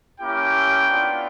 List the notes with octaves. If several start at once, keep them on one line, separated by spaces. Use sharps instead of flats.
A#3 C#4 E4 G4 G5
B3 D4 F4